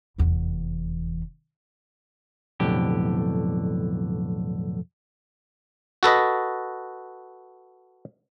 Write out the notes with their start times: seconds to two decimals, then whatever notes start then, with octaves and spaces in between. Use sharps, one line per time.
0.18 F1 E2
2.60 B1 F2 A2 D3 G4
6.03 F#4 A4 B4 D#5